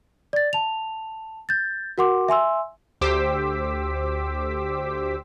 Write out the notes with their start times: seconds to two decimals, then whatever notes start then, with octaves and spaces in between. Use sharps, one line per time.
0.33 D5 A6
0.53 A5 F7
1.49 G6 A6
1.98 F#4 A#4 F#5 C6 D6
2.28 E5 G#5 C6 E6
3.01 D2 G4 C5 D6 E6 B6